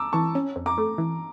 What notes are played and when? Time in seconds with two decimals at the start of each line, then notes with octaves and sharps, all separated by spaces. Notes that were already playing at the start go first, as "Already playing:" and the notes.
Already playing: A5 A#5 D6 E6
0.13 E3 A5 C#6
0.35 C#4
0.56 F2
0.66 A#5 D6
0.78 A3
0.98 E3